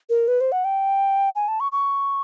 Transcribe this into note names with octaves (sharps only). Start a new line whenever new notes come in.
A#4
B4
C5
F#5
G5
G#5
A5
C#6
C#6